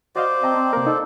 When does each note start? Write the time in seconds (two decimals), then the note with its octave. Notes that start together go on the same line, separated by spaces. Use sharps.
0.16 F#4 C5 D5 D#5 F5
0.43 C4 D#5 A5 A#5
0.56 C4
0.73 C3 A#3 A#4
0.86 D#4 A4